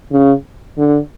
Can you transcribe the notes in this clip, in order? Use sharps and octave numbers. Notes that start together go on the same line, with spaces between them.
C#3
D3